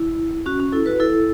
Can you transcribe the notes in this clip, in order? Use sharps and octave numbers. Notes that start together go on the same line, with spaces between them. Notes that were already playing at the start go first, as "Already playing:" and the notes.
Already playing: E4
C#4 F#4
C#4 F#4
E4 A4
F#4 B4
E4 A4